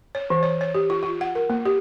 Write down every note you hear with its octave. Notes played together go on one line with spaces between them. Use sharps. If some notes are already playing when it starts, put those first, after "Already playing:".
C#5
E3
C#5
C#5
G4
F4
F4
F#5
A#4
A#3
G4